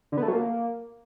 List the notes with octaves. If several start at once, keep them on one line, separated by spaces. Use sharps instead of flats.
D3
B3
A3
F#3
A#3